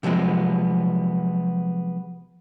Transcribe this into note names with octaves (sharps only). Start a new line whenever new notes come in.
C3 F3 F#3 G#3 B3